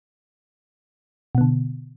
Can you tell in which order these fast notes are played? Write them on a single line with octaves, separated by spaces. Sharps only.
B2 B3 D3